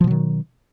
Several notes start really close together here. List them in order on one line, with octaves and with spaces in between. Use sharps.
F3 B2 F#3 D#3